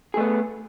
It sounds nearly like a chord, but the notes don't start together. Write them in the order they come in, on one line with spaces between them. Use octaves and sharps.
G#4 A3 B3